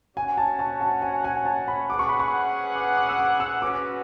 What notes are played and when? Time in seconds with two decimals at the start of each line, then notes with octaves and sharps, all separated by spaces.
0.16 C#4 F#4 C#5 F#5 G#5
0.38 A5
0.59 A5
0.81 A5
1.02 G#5
1.24 G#5
1.45 A5
1.68 B5
1.90 C#4 G#4 B4 F#5 D6
1.99 C#6
2.09 B5
2.20 C#6
2.75 D6
2.97 D6
3.09 E6
3.19 D6
3.40 E6
3.62 C#4 F#4 B4 D6